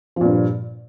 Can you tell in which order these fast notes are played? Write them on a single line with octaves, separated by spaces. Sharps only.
F3 A#2 G2